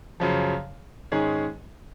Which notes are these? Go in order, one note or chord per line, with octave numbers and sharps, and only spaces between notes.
F#2 C#3 F3
G#2 D#3 G#3 C#4 G#4